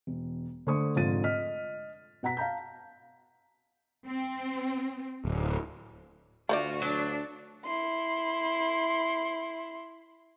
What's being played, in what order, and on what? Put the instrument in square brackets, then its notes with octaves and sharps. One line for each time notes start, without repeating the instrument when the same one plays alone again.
[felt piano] E1
D3 A3 C5 C#6 D#6
F1 G#2 D3 F4 A6 D#7
D#5 F6 B6
B2 F#5 A#5 B6
F5 A5 A#5 G6
[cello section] C4
[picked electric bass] D1
[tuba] D2 [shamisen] A3 B4 D5 [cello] F4 F#4
[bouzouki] F#3 [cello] D4
[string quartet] E4 C6